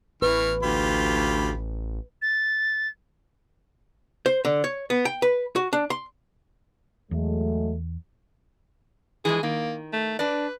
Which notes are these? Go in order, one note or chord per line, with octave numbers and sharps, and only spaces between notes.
A1 E3 B4 C#6 F6
D2 F4 G4 B5
A6
C5
D3
C#5
B3
G5
B4
F#4
D4
C6
E2 F#3 G#3 A3
E3 F3 G#3 G#4
D#3 A#3
A3
D4 B4 D5